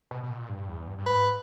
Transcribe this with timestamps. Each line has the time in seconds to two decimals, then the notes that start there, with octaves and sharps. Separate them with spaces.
0.11 B2
0.23 B2
0.30 A#2
0.49 G2
0.68 E2
0.88 G2
0.98 G2
1.06 G#2 B4